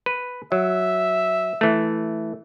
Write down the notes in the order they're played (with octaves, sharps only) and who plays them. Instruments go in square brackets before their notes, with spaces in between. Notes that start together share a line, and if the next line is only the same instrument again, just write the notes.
[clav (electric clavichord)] B4
[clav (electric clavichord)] F#3 [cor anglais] E5
[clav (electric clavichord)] E3 A3